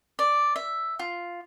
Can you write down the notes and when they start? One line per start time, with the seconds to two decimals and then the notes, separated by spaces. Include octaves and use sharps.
0.19 D5
0.56 E5
0.99 F4